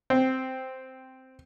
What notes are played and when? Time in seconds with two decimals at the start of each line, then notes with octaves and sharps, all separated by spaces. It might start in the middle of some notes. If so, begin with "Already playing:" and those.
0.10 C4